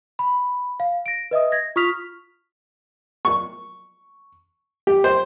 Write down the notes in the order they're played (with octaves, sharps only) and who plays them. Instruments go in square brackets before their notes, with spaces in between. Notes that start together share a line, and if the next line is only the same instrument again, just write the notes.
[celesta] B5
F5
A#6 D7
B4 D#5 E5 D#6
G#6 A#6
F4 C#6 D#6 F6 B6 F7
[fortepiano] C#6
G4
C5